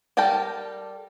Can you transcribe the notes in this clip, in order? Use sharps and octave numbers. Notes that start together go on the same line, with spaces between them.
G3 A4 A#4 G5 A5